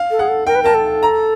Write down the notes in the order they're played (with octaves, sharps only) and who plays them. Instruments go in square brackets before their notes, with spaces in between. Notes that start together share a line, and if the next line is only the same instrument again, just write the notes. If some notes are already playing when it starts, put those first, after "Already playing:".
Already playing: [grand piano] F5
[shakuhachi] A4
[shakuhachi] G#4 [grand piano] F#5
[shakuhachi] A4
[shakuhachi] A#4 [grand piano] G5
[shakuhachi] B4
[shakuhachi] A#4 [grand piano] A5
[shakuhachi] A4
[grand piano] A#5